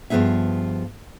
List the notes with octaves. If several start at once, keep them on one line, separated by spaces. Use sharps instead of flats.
G2 F3 B3 D#4 G#4 E5